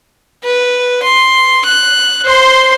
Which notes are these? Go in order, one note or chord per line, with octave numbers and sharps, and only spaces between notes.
B4
C6
F#6
C5 C6